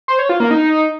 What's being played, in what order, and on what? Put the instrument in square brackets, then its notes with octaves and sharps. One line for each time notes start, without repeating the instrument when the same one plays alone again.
[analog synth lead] C5
C#5
F4
A#3
D#4